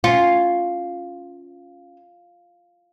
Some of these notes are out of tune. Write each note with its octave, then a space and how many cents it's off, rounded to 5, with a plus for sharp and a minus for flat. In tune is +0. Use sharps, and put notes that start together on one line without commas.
C#4 +0 F4 +0